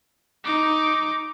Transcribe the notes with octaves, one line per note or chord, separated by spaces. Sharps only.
D#4 D6